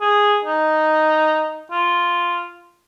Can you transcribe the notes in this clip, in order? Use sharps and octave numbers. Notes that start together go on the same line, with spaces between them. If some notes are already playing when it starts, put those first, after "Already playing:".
G#4
D#4
F4